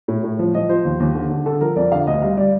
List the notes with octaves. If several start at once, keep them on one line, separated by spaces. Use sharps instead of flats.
A2
A2
F3
F3 D#5
F3 C5
D#2
D#2
D3
D3
D3 A4
F3 A#4
F2 D5
D3 F5
D2 D#5
G3 F5
G3 D5